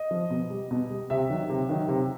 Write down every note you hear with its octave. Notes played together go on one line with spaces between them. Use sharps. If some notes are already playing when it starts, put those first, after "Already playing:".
Already playing: D#5
F3
B2
G3
B2
G3
C3 E5
D#3 F#3
C3
D#3 F#3
C3